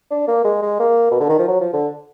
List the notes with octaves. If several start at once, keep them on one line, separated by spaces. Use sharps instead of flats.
D4
A#3
G#3
G#3
A#3
B2
D3
D#3
F3
F#3
F3
D3